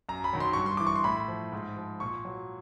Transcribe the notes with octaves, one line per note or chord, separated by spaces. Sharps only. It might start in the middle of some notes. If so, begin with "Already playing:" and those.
F#2 A#5
B5
D#3 F#3
C6
G2 C#6
C6
E3 D6
C#6
C6
A2 B5
F3
G#2
F3
A#2 C#6
F#3